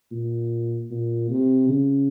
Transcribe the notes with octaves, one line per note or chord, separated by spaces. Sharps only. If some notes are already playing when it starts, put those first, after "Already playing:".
A#2
A#2
C3
C#3